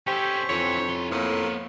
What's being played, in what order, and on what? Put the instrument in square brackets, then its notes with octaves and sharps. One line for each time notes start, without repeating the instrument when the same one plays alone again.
[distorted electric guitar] C#4 A4 [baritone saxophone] G4 [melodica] C5 E5 C#6
[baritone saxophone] F2 [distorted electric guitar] D3 E3 [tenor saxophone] C#5
[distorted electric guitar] E4 C6
[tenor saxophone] A2 [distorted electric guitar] A#3 B3 [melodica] A#4 F5 C6